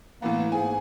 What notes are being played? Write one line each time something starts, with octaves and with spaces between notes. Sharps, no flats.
A2 E3 A#3 B3
G#2 G#4 G#5